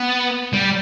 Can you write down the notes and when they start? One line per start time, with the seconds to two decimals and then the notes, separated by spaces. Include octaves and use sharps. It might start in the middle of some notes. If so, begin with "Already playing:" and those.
Already playing: B3
0.54 G3